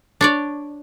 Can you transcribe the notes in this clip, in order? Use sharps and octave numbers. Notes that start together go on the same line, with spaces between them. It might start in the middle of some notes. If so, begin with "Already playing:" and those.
D4 C#5 D5